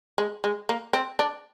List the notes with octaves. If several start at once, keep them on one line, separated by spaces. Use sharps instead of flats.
G#3
G#3
A#3
C4
D4